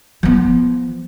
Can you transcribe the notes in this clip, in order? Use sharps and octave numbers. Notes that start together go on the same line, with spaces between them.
F3 B3